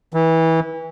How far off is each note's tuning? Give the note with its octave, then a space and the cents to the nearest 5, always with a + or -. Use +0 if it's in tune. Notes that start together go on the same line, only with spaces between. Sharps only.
E3 -25